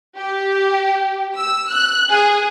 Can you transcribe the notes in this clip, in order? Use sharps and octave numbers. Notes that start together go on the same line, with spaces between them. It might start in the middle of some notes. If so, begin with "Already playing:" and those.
G4
E6
F#6
G#4